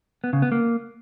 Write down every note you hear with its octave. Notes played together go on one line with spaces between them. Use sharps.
B3
C#3
B3
A#3